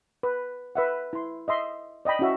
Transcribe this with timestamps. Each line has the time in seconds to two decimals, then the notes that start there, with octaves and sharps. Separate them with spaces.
0.23 B4
0.75 B4 E5 F#5
1.13 E4 C6
1.48 D#5 E5 C6
2.05 D5 D#5 G5 B5
2.19 C#4 E4 F#4 E5